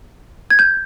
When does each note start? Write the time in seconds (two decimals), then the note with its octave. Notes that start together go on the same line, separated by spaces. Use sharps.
0.50 G#6
0.59 G6